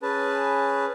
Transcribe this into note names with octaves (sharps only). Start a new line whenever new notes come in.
C#4 G#4 B4 A5